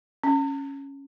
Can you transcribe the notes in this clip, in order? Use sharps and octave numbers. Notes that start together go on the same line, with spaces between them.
C#4